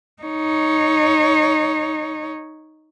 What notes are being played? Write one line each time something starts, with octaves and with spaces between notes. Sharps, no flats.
D#4 C#5